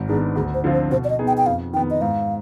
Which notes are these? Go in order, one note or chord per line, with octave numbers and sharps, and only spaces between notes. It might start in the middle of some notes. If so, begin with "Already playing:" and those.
Already playing: G#1
G#2 D#3 B3 D4 G#4
D2 G#4
C5
D3 F3 C4 F4
C5
B2 C5
D5
D#5
B3 D#4 G#4
G5
G5
F2 F5
D#3 B3 G5
D#5
G#2 F5